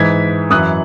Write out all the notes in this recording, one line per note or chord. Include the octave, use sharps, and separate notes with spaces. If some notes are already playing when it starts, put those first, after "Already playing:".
Already playing: G#2 E3 G#6 B6
F#2 E3 D#6 F#6